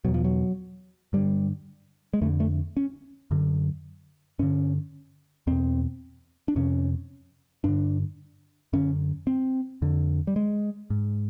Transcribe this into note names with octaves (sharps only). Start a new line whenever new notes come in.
E2 B2 F#3
F3
F#3
G2 D3 G3
G#3
F2 D3 A3
A3
C#4
F#2 D3
G2 D3 C#4
E2 B2 C4
D4
F2 C3 C#4
G2 D3 D4
F#2 D3 C#4
C4
F2 D3
G3
G#3
G#2